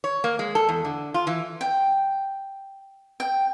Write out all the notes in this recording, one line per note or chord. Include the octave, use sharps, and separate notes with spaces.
C#5
A#3
G#3
A4
E2
D3
F4
E3
G5
G5